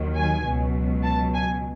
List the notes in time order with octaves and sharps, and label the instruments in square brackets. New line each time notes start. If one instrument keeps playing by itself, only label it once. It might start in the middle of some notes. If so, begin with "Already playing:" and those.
Already playing: [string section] D#2 D#3 F#3
G#5
C#2 B2 F#3
A5
G#5